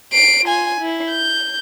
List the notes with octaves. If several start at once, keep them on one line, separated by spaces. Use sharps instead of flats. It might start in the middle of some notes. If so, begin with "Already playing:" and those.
C7 D7
F4 G#5
E4
G6